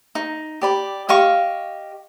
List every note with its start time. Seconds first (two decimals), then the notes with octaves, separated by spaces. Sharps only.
0.15 D#4
0.61 G4 D5 B5
1.09 G4 D#5 F5 C#6